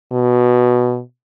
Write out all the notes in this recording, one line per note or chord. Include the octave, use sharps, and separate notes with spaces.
B2